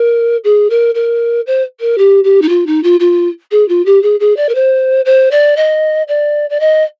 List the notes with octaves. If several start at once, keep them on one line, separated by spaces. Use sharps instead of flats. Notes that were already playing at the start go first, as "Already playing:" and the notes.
Already playing: A#4
G#4
A#4
A#4
C5
A#4
G4
G4
D#4
F4
D#4
F4
F4
G#4
F4
G4
G#4
G#4
D5
A#4
C5
C5
D5
D#5
D5
D5
D#5